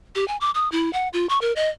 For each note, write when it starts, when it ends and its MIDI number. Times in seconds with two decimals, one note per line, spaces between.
0.15 0.27 67
0.28 0.37 80
0.41 0.51 86
0.55 0.70 87
0.72 0.92 64
0.93 1.09 78
1.13 1.27 65
1.29 1.39 85
1.41 1.53 70
1.56 1.69 75